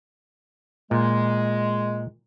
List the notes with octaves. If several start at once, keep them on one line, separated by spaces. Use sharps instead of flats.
A#2 G#3